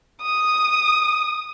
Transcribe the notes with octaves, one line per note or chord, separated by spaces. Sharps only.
D#6